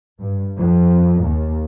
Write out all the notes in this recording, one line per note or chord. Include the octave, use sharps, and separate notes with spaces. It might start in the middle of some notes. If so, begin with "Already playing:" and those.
G2
F2
D#2